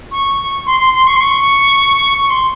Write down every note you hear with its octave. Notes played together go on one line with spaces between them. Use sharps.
C#6
C6
C6
C6
C#6
C6
C#6
C#6
C6